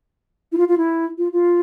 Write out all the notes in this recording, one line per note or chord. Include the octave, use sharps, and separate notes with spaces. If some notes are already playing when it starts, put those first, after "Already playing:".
E4
F4
F4
E4
F4
F4